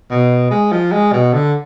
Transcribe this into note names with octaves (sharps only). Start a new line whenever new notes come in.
B2
G#3
F3
G#3
B2
D3